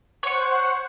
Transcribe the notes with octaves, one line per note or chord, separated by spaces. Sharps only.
C5 C#5 F#5 C#6